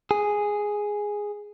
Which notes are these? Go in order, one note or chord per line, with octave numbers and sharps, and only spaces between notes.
G#4